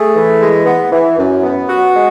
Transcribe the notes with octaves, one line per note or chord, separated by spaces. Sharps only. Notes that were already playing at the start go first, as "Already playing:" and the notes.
Already playing: A3 G#4
E3
G#3
B3
E3
F#2
B3
F#4
G#3